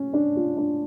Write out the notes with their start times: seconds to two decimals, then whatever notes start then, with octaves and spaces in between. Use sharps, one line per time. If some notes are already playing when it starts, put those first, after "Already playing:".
Already playing: C#4
0.13 D4
0.36 F4
0.57 D4